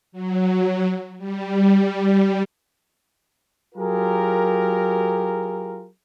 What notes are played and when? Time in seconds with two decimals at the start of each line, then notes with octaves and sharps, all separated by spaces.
0.12 F#3
1.18 G3
3.75 F#3 F4 G4 G#4 A#4